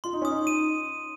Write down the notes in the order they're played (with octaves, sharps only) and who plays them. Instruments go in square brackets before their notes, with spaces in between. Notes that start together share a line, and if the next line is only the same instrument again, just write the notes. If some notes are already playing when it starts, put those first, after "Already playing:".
[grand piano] F4 [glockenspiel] C6
[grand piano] D#4
[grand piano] C#4 [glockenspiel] D#6
[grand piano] D#4
[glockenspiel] D#7